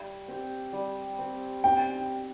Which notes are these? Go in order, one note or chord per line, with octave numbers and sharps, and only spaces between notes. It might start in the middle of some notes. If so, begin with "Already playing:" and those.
Already playing: G3
C4 G4
G3
C4 G4
C4 G5